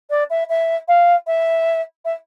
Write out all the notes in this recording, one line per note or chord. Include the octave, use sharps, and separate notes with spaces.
D5
E5
E5
F5
E5
E5